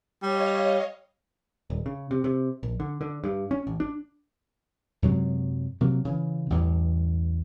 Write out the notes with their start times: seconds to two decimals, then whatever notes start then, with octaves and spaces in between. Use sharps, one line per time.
0.22 G3 C#5 D#5 F5
1.70 D#1
1.86 C#3
2.11 C3
2.24 C3
2.63 A#1
2.80 D3
3.01 D3
3.24 G2
3.51 C#4
3.67 A1
3.80 D4
5.02 F#2 C3 F#3 G#3
5.81 C3 F#3 A#3
6.05 C#3 E3
6.50 A1 E2 G2